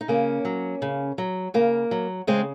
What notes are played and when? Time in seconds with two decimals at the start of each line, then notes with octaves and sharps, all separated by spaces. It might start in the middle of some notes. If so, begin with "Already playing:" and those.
0.01 D#4
0.08 C#3 A#3 C#4
0.45 F#3
0.82 C#3
1.18 F#3
1.54 C#3 A#3
1.91 F#3
2.27 C#3 G#3 C4